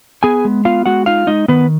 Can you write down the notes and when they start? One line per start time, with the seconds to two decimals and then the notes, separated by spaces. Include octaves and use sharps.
0.23 B3 G#4 G#5
0.45 G#3
0.65 B3 F4 F5
0.86 G#3 F#4 F#5
1.06 D#4 F4 F5
1.27 G#3 D#4 D#5
1.48 D#3 B3 B4